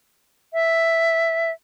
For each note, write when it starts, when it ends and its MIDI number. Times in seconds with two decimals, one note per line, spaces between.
0.53 1.51 76